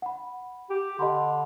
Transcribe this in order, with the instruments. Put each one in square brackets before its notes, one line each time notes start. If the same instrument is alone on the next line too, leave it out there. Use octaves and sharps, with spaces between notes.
[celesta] F#5 B5
[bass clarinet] G4
[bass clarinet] D3 [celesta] D#5 B5 C6